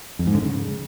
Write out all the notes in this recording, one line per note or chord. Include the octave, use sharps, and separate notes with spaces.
F2
G#2
D3
C#3